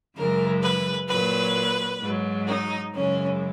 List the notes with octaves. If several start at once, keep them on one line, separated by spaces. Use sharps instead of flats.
F#2 C#3 E3 G#3 A#4
B4
A#2 F#3 B4
G#2 F#3
D#4
F#2 C#3 E3 G#3 C#4